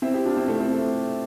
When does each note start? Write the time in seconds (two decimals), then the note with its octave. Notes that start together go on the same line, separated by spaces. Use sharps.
0.02 C4 E4
0.14 E4 G4
0.25 D4 F4
0.37 C4 E4
0.48 A3
0.59 A3 C4
0.71 A3